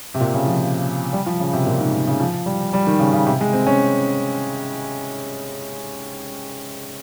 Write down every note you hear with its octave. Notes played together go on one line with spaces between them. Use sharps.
C3
A#2
C#3
F3
G3
F3
C#3
C3
A#2
G#2
C#3
F3
G3
G3
D#3
C#3
C#3
C3
G#3
C4
C#4